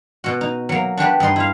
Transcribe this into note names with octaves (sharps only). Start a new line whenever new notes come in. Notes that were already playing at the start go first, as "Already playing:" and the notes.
B2 F#4
D#4
F#3 A#3
D4 F#4 G4 B4
G2 D#4 D#5 C6
E4 F5